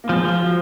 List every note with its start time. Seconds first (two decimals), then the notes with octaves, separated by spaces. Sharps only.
0.04 A#3
0.09 F3 G#3
0.25 F3
0.40 F#3